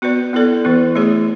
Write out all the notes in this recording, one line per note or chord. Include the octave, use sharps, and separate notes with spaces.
B3 F#4 B4 D5
B3 E4 A4 D5
E3 B3 E4
A3 E4 G#4 C#5